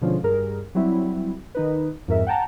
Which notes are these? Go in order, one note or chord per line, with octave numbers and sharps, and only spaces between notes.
B2 D3 F3 G#3 C#4 F4
G2 G#4 A#4
F#3 G3 C4 E4
D#3 D#4 B4
F2 G#2 A#4 E5
F#5 G5 A5 A#5